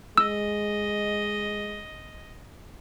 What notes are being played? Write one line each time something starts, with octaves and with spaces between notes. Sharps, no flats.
G#3 D#5 E6